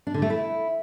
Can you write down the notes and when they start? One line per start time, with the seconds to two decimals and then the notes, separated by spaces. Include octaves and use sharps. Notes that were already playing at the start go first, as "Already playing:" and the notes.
0.07 D4
0.14 D3
0.22 A3
0.30 E4